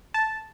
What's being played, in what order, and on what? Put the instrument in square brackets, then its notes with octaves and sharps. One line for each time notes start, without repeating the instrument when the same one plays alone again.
[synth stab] A5